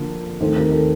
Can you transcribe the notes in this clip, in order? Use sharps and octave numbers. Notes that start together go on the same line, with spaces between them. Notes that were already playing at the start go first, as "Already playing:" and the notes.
Already playing: D3 F3 A#3
D#2 D#3 A3 C4 A4 C5
G4 A#4
A4